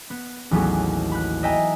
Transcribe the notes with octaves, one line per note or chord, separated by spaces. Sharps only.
B3
A1 D#2 F#3 B3 G#4 A4
B5 F#6
D#5 E5 G5 G#5 A#5 D#6